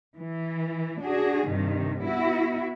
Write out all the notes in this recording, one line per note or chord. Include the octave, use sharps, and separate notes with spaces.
E3
D4 F#4 G#4
G2 C3 D#3
B3 E4 F#4